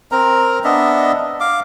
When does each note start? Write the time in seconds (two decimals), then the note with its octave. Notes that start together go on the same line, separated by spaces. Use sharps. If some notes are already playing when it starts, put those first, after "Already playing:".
0.12 C4 A#4 A#5
0.64 B3 D4 D#5 E5
1.40 F5 D6